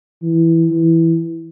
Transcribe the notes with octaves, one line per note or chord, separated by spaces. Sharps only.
E3
E3